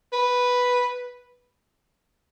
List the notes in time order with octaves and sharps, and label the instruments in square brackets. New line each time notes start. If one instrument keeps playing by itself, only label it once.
[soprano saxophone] B4